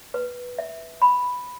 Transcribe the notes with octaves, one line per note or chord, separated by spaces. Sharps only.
B4
E5
B5